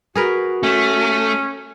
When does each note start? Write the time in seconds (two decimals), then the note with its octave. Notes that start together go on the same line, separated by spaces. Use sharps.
0.15 F#4 G#4 A#4 B4
0.63 A3 C#4